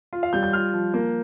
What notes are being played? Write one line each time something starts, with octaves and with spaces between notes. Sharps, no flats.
F4
F5
G3 G6
G6
F4 F6
F3
A#3